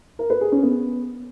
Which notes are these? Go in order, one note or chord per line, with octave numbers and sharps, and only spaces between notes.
A#4
B4
G#4
C#4
B3